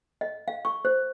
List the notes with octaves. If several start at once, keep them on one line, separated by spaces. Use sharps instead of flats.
D#5
F5
C#6
C5